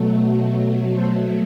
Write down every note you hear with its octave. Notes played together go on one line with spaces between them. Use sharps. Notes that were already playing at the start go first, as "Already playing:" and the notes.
Already playing: B2 F#3 A3
A4 C5